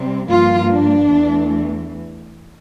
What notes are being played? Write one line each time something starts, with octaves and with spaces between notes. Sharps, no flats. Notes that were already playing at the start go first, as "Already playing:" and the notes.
Already playing: C3 G3 C4
G2 F3 A#3 F4
D4
E2 E3 A3